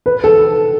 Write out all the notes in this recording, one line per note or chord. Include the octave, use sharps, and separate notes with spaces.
B4
A4